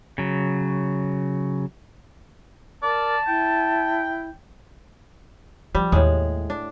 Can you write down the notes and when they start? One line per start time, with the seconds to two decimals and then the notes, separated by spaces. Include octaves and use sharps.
0.18 C#3 F#3
2.83 A#4 D5 A5
3.28 E4 G5
5.75 F3 G3
5.92 D#2 A2 G#3
6.50 D4